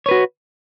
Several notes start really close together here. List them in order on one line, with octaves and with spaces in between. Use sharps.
C#5 B4 F#4